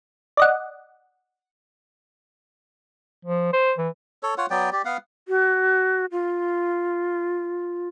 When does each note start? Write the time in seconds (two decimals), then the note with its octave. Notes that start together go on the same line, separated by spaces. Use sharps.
0.37 D5 D#5 F#5
3.25 F3
3.53 C5
3.78 E3
4.23 A4 C#5
4.38 F4 C#5 F#5
4.50 F#3 B3 D5 G5
4.73 G4 D5
4.85 B3 F5 F#5
5.28 F#4
6.12 F4